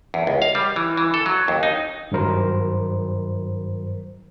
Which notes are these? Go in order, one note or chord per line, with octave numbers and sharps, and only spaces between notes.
E2
C#2
F5
G3
E3
E3
A4
F#3
D#2
D#4
G2 D#3 F#3 A#4 C5